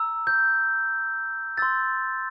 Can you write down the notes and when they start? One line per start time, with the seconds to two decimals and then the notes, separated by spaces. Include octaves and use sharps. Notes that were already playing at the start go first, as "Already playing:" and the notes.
Already playing: A#5 E6
0.27 G6
1.58 C6 E6 G6 A6